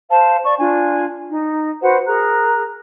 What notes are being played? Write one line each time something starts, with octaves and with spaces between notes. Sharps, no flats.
C5 F5 A5
D5 C#6
D4 F4 G#5
D#4
F#4 B4 C5 F#5
G#4 A#4 A#5 F#6